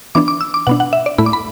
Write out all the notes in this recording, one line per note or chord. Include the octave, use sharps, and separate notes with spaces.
E3 B3 D4 D6
D6
E6
D6
B2 B3 D4 F#5
F#5
E5
D5
A2 A3 E4 B5
D6
B5